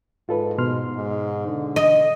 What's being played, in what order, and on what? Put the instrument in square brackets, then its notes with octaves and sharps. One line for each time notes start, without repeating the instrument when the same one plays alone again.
[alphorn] G#2 [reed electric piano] F4 A4 B4
[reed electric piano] B2 C6 F6
[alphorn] G#2
D3
[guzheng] D#5